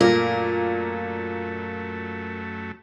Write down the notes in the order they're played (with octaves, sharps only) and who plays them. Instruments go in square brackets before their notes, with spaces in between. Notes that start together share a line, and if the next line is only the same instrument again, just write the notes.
[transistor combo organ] F#2 A3 [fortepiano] A#2 [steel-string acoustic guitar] A#4